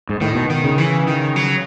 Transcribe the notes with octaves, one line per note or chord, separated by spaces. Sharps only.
G#2
A2 D#3
B2
D#3
C#3
E3
D#3
F#3